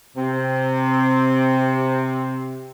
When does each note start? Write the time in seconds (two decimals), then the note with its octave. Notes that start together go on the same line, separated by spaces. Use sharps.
0.16 C3 C4